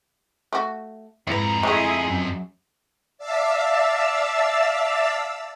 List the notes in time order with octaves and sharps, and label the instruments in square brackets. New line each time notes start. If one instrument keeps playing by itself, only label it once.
[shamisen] A3 F#4
[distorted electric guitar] F2 A#5 [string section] G#2 [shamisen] E4 B4
[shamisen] G#3 A3 [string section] E4 G#4 D#5
[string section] F#2
[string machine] D5 E5 F5 A5 E6